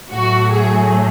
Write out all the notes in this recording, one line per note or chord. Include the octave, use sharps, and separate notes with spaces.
A2 F#3 A3 F#4
G#4